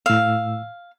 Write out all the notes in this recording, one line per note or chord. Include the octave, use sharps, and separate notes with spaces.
A2 F5 E6